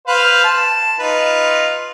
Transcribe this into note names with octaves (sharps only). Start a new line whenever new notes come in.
B4 C5 F5
A5
D#4 F4 B4